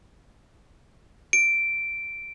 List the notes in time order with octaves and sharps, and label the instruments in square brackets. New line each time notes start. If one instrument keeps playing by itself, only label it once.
[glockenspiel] D7